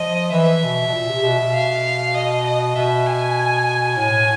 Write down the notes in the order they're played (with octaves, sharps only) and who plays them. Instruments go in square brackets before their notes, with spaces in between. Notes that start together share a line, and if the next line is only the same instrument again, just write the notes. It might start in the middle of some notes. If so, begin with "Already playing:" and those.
Already playing: [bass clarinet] F3 [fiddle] D#5
[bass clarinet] E3 [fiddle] E5
[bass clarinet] B2
B2
A#2
C3
B2
B2
[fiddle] F5
D#5
D#5
[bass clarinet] B2 [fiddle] E5
[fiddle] G#5
[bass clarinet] A2 [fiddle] G#5